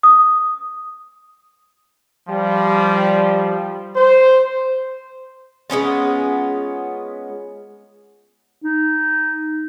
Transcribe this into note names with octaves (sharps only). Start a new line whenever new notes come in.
D#6
F3 G3
C5
G#3 B3 C#4 F4
D#4